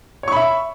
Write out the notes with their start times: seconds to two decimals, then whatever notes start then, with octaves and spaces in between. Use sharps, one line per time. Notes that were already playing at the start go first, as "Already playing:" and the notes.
0.23 C#5
0.28 C#6
0.32 B5
0.36 E5